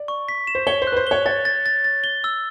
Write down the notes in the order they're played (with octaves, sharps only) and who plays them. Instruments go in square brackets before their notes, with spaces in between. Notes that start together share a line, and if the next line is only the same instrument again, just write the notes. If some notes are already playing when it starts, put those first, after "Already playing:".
Already playing: [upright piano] D5
[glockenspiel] C#6
B6
E7
[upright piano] C5
[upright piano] C#5 [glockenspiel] G7
[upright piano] C5
[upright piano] B4 [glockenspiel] F#6
[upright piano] C5
[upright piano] C#5 [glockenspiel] G7
[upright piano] C#5 [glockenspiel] A6
[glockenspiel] A6
A6
A6
G7
E6